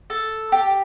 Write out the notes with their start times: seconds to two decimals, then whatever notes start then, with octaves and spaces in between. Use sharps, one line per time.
0.10 A4
0.52 G4